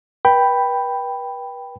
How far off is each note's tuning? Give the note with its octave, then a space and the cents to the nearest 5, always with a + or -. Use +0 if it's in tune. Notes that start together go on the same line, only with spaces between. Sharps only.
B4 -35 G5 +0 B5 +0